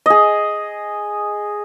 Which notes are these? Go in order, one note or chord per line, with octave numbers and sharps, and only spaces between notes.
G#4 D#5